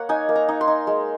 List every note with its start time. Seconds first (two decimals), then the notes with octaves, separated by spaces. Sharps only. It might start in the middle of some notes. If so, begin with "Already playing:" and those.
Already playing: A#3 A#4 C#5 F#5
0.09 D#4 G#5
0.29 A#3
0.36 A#5
0.49 D#4
0.61 C6
0.68 D#4
0.87 G#3